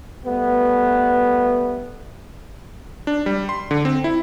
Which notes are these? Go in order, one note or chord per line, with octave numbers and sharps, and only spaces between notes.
G3 A3 B3
D4
G3
C6
D3
C4
E4